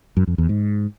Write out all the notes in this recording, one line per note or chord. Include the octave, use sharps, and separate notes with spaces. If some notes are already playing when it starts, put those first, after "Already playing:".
F#2
F2
E2
G#2